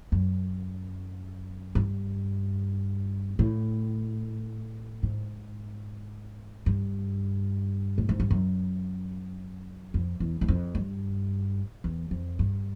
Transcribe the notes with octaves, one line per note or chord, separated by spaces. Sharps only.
F#2
G2
A2
G#2
G2
A2
G#2
G2
F#2
F2
E2
E2
F2
G2
E2
F2
G2